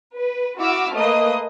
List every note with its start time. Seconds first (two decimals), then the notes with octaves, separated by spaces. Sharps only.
0.16 B4
0.59 E4 F#4 E5 D6 E6 F6
0.95 A3 A#3 B4 D#5 D#6